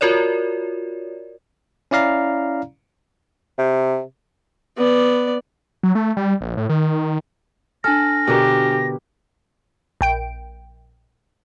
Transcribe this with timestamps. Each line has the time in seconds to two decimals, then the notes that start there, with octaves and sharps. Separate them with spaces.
0.01 F4 F#4 A#4 C#5 D5
1.91 C#4 E4 D5 F5 A#5
3.58 C3
4.78 B3 D5
5.83 F#3
5.95 A3
6.17 G3
6.41 A#1
6.57 A2
6.69 D#3
7.84 D4 A4 G#5 F6 A#6
8.28 B2 D3 G4 A#4
10.01 A#1 G5 D7